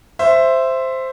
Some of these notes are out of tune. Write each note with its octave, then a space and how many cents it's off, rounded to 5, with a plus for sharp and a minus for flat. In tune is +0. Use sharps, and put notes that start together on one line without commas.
C5 +0 E5 +10